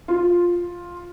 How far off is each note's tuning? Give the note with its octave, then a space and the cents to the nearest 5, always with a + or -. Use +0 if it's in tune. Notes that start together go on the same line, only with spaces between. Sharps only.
F4 +5